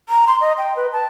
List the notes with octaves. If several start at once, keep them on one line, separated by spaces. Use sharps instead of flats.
A#5
C6
D#5
G5
B4
A5